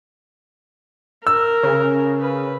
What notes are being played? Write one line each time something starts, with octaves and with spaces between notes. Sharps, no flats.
A#4 E6
C#3
B4